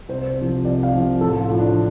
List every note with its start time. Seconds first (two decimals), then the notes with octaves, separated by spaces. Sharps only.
0.09 C2 C5
0.37 C3 F3
0.65 C2 D5
0.83 F5
0.93 C3 F3
1.21 A1 A4
1.39 F4
1.50 A2 F3
1.59 D4